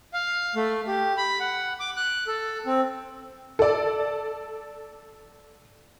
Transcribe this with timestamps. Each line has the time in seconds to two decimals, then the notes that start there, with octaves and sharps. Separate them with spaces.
0.14 F5
0.55 A3
0.87 G4
1.18 B5
1.40 F#5
1.80 D6
1.97 F#6
2.27 A4
2.66 C4
3.59 A4 D5